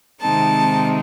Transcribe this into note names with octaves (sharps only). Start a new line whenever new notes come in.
C3 D#3 G#3 C4 D#4 A5